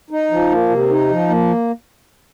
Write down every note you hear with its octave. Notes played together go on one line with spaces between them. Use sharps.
D#4
F3
A#3
C3
D#4
F3
A#3